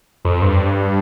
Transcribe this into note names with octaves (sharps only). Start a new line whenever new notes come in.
F2
G2